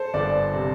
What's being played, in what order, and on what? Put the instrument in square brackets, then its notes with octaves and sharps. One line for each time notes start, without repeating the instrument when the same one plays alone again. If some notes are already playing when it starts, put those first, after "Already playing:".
Already playing: [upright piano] A4 C5
[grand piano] G1 [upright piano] D5
[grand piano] C3